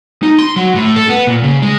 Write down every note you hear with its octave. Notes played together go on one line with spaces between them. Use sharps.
D#4
C6
F#3
A2
A4
B3
A#2
C#3
G#3